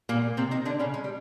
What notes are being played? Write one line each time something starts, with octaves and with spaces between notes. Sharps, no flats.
A#2 A#3
C3 C4
D#3 D#4
D3 D4
C#3 C#4
G#3
G3